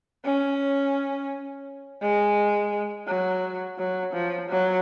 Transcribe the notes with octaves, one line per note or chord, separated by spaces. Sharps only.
C#4
G#3
F#3
F#3
F3
F#3